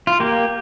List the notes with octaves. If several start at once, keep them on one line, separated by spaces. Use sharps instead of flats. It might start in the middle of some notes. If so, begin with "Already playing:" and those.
F4
A#3 G4